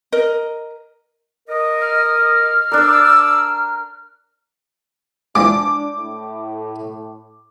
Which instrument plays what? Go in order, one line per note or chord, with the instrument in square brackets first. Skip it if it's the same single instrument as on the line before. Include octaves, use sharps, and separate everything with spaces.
[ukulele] A#4 D#5
[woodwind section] A#4 D#5
[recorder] F6
[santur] D4 A#4 [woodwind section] D5 D6 E6
[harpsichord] E3 F3 G#3 [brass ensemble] D4 [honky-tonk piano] D6
[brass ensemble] A2